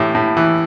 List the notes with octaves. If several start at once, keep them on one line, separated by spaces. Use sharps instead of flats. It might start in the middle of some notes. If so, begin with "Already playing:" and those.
Already playing: A2 E3 G4
A2
E3